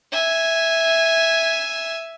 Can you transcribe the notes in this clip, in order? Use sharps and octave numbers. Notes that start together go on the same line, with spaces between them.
E5 G#5